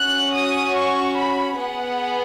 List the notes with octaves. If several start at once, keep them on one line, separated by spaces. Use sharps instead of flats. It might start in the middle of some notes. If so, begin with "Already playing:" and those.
Already playing: C#4 F#4 F#6
D#6
C#6
B5
B3 G#4 F#5